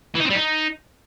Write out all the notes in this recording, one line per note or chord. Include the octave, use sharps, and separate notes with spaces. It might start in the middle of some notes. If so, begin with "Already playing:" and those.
E3
D#4
C4
G3
D#4